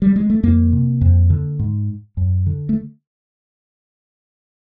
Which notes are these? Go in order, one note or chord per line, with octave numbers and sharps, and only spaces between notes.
G3
G#3
A3
F2 A#3
C3
F2
D3
G#2
F#2
D3
A3